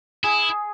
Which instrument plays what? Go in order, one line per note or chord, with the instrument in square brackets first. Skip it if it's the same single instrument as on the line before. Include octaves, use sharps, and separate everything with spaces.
[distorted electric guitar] E4 [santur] G#4